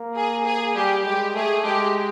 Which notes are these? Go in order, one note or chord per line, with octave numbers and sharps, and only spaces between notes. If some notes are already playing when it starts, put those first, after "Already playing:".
Already playing: A#3
G#4
G#4
G3 G4
G#3 G4
A3 G#4
G#3 G4